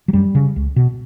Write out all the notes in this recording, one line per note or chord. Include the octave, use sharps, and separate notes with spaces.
F#3
F#2 G3
C#3
C#2
B2